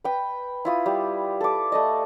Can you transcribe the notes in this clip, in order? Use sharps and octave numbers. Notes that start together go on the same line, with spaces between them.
B4 G5
E4 F4 D#6
G3
A4 D6
A3 D5 D#5